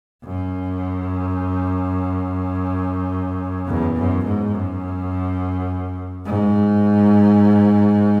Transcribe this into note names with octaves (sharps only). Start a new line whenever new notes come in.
F#2
E2
F#2
G#2
F#2
G#2